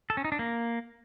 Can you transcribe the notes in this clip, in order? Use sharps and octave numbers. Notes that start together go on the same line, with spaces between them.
A4
C#4
D#4
D4
A#3